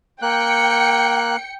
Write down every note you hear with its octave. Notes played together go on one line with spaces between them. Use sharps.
A#3 G5 F#6 C#7